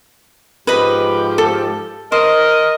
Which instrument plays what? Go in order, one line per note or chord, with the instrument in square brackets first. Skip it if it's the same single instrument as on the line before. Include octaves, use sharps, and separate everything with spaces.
[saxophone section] G#2 F3 G4 [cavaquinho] B4 D#5 B5
[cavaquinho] A4
[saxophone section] A#4 D#5 [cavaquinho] C5